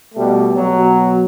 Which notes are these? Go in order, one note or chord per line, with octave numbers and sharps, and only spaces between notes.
B2 G3 A3
B2 F#3